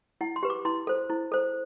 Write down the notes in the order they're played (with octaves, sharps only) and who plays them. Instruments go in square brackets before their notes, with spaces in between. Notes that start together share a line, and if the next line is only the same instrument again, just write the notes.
[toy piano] E4 F#5
C6
G4 B4
D6
E4 C6
A4 C5
E4
A4 C5